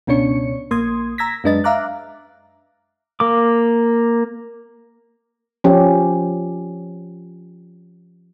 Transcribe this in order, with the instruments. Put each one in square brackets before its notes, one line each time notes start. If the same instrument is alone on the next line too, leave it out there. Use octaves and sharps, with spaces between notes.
[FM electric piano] C#2 B2 C#4 D4 C#5 C#7
A#1 A#3 C6 D#6 G#6
A#5 E6 G#6 A#6 B6
F#2 G#3 D4 B4 D#5 A6
E5 F5 A#5 D6 F#6
[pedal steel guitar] A#3 D6
[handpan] F3 C#4 G4